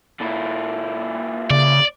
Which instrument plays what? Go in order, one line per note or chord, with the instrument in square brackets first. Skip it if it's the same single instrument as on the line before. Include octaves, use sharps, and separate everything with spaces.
[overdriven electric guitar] A#2 E4
[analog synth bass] C#3 [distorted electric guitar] D5